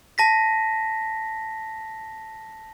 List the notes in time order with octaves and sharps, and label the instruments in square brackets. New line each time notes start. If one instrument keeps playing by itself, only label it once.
[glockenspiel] A5 A#6 B6